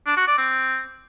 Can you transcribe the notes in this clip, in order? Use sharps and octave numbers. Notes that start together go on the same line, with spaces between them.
D4
F#4
D5
C4